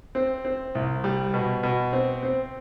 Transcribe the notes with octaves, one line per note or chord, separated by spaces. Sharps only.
C4
C4
C2
G3
B2
B2
C4
C4